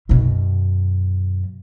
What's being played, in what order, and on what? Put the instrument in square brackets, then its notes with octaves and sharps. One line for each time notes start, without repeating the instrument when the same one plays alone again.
[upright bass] F#2 B2